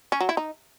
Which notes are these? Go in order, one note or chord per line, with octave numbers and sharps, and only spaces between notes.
C#4
F#3
E4
D#4